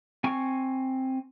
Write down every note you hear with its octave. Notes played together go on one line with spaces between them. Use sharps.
C4 G#5 C#6